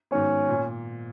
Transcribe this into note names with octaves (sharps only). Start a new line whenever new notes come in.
G#2 D#3 F#3 B3 C#4
A#2